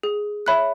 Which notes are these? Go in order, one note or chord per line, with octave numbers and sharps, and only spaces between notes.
G#4
C#5 E5 B5 F#6